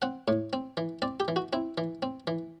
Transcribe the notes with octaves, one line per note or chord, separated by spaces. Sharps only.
C4 F#5
A2
C4
E3
C4 D5
G4
E3
F#4
C4 E4
E3
C4
E3